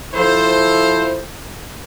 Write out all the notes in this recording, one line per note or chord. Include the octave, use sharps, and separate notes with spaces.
F3 E4 A4 C5